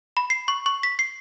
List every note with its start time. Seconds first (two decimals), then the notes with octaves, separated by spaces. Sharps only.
0.17 B5
0.30 C7
0.48 C#6
0.66 C#6
0.83 B6
0.99 C7